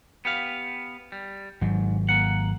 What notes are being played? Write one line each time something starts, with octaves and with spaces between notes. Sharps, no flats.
B3 G4 F5
G3
G#1 G#2 F#3
A#3 F#5